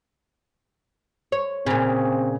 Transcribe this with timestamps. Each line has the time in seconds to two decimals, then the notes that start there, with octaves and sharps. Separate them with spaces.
1.32 C#5
1.66 A#2 C#3 C4